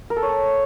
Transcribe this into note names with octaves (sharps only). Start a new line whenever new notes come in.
A#4
A4
C#5
A5